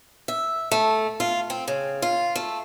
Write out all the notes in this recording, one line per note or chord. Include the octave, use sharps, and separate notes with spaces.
E5
A3
F4
C4
C#3
F4
A3